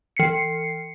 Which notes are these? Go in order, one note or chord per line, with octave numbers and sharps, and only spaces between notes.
E3 C7 C#7